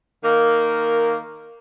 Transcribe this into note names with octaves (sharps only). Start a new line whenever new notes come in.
D#3 A#3